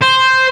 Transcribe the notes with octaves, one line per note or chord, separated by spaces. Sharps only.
C5